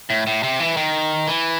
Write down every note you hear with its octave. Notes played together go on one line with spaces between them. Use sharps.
A2
A2
C3
E3
D#3
E3